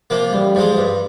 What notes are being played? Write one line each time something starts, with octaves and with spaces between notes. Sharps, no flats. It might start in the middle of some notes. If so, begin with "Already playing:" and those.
C3 F3 A#3
A1 G3
G#2 F3 G#3
G2